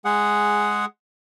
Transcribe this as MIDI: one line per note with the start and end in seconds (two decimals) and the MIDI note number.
0.05 0.85 56
0.05 0.85 68
0.05 0.85 78